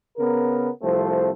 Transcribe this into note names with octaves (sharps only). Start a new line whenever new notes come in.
C#3 B3 A#4
C2 F3 A3 C4 C5